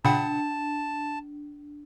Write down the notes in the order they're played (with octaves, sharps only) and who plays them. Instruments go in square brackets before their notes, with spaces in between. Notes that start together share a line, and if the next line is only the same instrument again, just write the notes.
[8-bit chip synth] A#2 C#3 F#5 [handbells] D4 [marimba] G5 B5 [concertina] A5